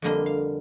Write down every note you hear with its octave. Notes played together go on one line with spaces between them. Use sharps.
F2 D3 G3 A#3 D#5
F5